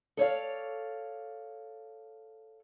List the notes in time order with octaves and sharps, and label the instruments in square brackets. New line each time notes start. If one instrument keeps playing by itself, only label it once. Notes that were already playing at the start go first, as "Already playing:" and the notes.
[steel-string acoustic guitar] A4 C#5 D5 F5